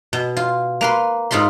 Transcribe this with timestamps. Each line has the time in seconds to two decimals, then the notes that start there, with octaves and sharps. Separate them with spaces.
0.13 B2
0.37 F4
0.81 A#3 B4 C6
1.31 G#2 D#4 F4 B5 C6